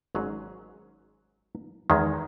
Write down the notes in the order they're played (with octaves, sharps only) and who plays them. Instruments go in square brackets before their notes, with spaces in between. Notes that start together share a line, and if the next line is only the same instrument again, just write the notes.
[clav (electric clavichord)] G#1 G#2 F#3 C#4 G#4
E2 D#3 G#3